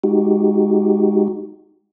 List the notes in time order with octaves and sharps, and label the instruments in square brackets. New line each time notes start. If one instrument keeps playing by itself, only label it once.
[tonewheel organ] G#3 D#4 F#4 G4